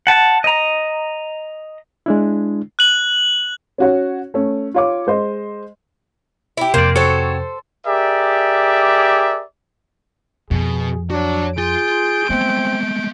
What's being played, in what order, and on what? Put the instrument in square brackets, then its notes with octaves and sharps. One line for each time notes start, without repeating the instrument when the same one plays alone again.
[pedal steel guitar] F#5 A5
D#5 A#5
[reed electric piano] G#3 D4 E4
[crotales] F#6 F#7
[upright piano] C#4 F#4 C#5
A3 C#4
F4 C#5 D6
G#3 C5 D#5
[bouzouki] E4 G4
[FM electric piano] F2 C3 [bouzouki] A#3 [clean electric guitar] C5 D5
[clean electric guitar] C4 F#4 C#5 [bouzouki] A4 C5
[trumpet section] G4 G#4 A#4 D5 E5
[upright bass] F2 [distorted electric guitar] B2 [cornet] G#4
[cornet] D4 [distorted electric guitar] F#4 C#5
[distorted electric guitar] F4 C6 [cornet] G#4 [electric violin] G6 D7
[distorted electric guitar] G#3 A3 [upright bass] B3 [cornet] C4